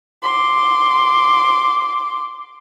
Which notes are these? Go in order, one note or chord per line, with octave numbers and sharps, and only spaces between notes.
C6 D6